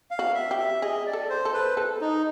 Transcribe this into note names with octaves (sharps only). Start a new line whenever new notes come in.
F5
F#4
E5
G4
E5
G#4 D#5
D5
A4
C5
A4
B4
A4
D#4